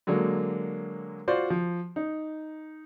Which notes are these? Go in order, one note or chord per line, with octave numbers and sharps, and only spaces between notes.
D3 F#3 G#3 A#3
F4 F#4 C5 D5
F3
D#4